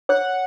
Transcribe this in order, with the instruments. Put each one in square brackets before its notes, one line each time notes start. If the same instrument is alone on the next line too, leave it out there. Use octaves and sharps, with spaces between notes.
[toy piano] C#5 [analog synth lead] F#5